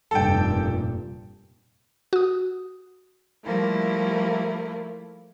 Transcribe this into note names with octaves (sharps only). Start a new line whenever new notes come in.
F1 G2 A#2 A4 G5
F#4 D#6
F3 G3 A3 A#3 E4